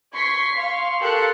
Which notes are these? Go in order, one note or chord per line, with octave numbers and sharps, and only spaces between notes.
C6 C#6 G#6 B6 C7
F5 C6 C#6
G4 A4 A#4 C6 F#6 C#7